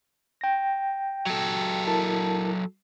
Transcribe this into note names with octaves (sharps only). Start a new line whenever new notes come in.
G5 A#6
F#3 A4
E4 A#4 A5